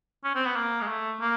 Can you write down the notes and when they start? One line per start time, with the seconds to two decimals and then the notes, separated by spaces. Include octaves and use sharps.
0.24 C#4
0.35 C4
0.46 B3
0.56 A#3
0.82 G#3
0.88 A3
1.21 A#3